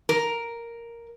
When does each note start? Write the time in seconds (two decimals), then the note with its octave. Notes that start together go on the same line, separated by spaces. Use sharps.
0.09 A#4